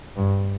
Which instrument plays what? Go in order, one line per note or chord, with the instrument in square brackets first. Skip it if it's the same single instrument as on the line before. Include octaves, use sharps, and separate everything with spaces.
[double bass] G2